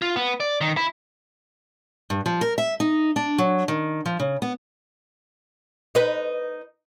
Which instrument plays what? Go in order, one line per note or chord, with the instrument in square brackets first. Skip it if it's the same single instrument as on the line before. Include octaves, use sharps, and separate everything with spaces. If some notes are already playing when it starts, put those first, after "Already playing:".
[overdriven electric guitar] F4
B3
D5
D#3
E4
[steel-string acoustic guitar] G2
F3
A#4
E5
D#4
D4
F#3
D#3
F3
C#3
B3
[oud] D#4 B4